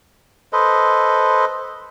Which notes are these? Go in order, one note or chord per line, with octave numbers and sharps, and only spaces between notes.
A4 B4 C5 D#5